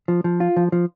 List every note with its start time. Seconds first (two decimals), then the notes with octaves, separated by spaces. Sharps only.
0.08 F3
0.24 F3
0.40 F4
0.57 F3
0.72 F3